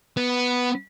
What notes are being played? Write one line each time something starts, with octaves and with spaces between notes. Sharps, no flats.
B3